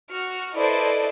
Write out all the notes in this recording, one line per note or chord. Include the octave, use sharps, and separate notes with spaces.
F#4 F6 C#7
E4 A4 B4 C5 D5 D#5